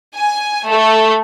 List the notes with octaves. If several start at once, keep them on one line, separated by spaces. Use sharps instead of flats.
G#5
A3